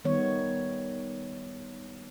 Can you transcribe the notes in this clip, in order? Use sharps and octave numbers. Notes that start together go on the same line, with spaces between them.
D#3 G3 B3 C#5